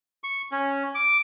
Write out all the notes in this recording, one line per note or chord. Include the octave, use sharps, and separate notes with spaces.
C#6
C#4
D6